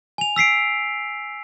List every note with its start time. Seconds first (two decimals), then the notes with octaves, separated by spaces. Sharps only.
0.18 G#5 F7
0.36 E6 B6 C7 D7